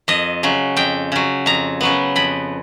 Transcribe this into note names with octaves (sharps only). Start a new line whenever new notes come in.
F2 D#5
C#3 F#3
F2 G5
C#3 F#3
F2 A#5
C#3 F#3 B3
F2 B5